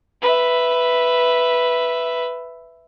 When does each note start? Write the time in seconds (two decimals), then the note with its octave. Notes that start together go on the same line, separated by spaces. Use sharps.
0.22 B4 E5